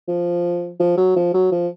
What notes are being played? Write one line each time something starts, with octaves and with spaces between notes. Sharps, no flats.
F3
F3
F#3
F3
F#3
F3